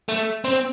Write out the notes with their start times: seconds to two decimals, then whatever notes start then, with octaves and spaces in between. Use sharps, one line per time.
0.09 A3
0.45 C4